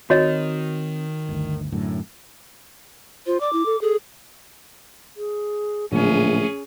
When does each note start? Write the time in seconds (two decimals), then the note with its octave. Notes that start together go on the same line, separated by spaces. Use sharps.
0.10 D#3 C4 F#4 C#5 D#5
1.29 G1 D2
1.72 F#2 A2 D3
3.26 F4 C5
3.41 D5 D6
3.53 E4
3.66 A4
3.81 G#4 A4
5.17 G#4
5.92 A#1 A2 D3 F#3 A3 C#4 G#4